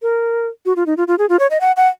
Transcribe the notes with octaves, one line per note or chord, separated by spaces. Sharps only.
A#4
F#4
F4
D#4
F4
F4
G#4
F4
C#5
D#5
F#5
F#5